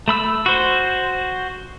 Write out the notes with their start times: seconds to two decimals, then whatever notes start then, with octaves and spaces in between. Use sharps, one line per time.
0.08 A3 B5 E6
0.46 F#4 C5